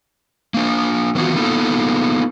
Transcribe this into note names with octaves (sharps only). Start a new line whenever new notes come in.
A#3 D4
D#3 E3 B3 F4 F#4
A#3 B3 D#4 F4 A4